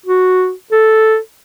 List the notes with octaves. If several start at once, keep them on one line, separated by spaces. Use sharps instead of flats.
F#4
A4